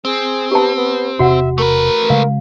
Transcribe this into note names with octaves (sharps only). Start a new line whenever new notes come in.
C4 G#4
B3 G4 A5
B3
E1 C3 F#4 E5 F#5
A3 A#4 B4
C#3 G#3 F5